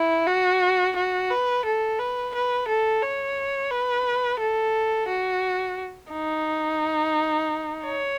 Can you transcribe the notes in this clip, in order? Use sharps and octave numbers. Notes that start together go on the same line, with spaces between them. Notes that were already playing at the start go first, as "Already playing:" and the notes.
Already playing: E4
F#4
F#4
B4
A4
B4
B4
A4
C#5
B4
A4
F#4
D#4
C#5